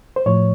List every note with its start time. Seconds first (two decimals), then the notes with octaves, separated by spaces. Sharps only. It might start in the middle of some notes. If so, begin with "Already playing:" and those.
0.16 C5
0.26 A2 F3 C#5